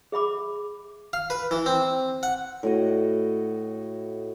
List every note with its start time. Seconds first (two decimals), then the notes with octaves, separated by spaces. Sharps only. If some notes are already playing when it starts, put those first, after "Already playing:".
0.12 G#4 E5 B5 D6
1.13 F5
1.30 B4
1.51 E3
1.66 C4
2.23 F#5
2.63 A2 F#4 D#5